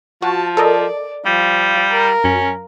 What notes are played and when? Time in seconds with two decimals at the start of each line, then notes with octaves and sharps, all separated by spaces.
0.22 F3 F#4 A5
0.57 A4 A#4 D5 D#5
1.26 F3 G3
1.91 A#4
2.24 F#2 C#4